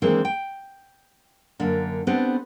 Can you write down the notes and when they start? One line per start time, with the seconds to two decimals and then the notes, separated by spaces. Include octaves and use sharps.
0.02 D#3 E3 G#3 A#3 C4 D4
0.25 G5
1.60 F#2 D3 A#3 D4
2.07 B3 C4 D4 G4 A4